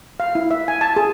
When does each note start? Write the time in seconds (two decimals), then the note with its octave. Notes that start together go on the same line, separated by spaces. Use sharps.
0.20 F5
0.35 E4
0.51 E5
0.68 G#5
0.81 A5
0.96 G#4